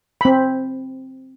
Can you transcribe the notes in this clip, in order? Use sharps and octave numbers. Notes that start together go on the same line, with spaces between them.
C4 B5